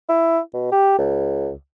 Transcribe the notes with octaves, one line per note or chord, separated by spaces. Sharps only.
E4
B2
G4
C#2